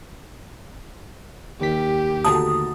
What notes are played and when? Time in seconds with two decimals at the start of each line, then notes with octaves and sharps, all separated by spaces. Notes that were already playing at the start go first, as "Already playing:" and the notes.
1.60 D#2 D#3 G4 B6
2.24 D2 A5 A#5 D#6